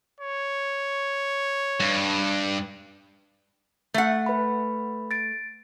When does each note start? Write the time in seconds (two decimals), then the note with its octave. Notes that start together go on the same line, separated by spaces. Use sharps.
0.21 C#5
1.80 G2
3.94 A3 F#5
4.26 B4 B5
5.11 A6 D7